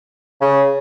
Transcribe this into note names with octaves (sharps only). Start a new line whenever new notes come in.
C#3